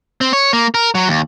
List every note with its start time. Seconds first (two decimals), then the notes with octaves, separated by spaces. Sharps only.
0.21 C4
0.33 C#5
0.53 A#3
0.74 A#4
0.95 F#3
1.08 D#2